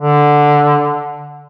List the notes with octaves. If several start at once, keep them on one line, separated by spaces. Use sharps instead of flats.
D3